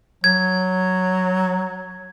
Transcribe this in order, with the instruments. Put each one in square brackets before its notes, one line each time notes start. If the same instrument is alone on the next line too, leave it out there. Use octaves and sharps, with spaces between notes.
[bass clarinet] F#3 [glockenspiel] G#6